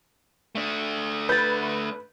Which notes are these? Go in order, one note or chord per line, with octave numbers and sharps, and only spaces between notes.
A3 D4
B4 G6 A6